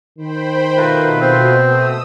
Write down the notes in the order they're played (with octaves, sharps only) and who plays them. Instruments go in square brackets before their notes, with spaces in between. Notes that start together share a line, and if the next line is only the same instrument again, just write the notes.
[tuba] D#3 [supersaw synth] C5 G5 B5
[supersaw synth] B2 [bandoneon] A3 F4 B4 [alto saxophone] A#4
[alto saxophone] C4
[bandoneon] A3 [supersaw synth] D#6 E6